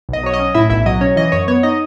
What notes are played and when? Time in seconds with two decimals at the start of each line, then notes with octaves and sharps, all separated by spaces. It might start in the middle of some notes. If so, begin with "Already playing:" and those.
0.09 B1 D#5
0.23 F#3 C#5
0.34 D#5
0.40 C#4
0.55 A2 E4 E5
0.70 B1 E4 E5
0.86 F#3 D#5
1.01 C#4 C#5
1.16 E3 D#5
1.32 F#2 C#5
1.48 B3 C#5
1.63 D#4 D#5